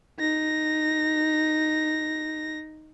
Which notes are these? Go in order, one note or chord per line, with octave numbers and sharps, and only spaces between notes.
D#4 A#6